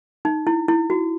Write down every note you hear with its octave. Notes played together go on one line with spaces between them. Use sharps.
D#4
E4
E4
F#4